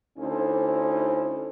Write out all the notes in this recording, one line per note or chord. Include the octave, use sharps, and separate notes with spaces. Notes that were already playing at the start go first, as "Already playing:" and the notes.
D2 C#4 D#4 E4 A4 C5